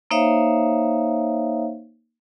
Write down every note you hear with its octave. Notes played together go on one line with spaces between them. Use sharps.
A#3 D#4 C5 C#5 E5 F5